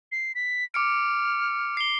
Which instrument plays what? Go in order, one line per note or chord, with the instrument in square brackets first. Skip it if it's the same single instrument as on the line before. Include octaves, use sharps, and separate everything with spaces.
[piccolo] C7
B6
[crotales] D6 C#7 D7 [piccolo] F6
[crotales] C7 G7